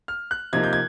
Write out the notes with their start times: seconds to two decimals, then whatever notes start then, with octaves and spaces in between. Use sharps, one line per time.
0.08 F6
0.31 F#6
0.53 C3 F3 A#3 D#4 G#6
0.64 G6
0.73 G#6